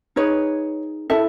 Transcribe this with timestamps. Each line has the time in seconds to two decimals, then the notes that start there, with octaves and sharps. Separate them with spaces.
0.16 D#4 G#4 B4 C#5
1.10 E4 A4 E5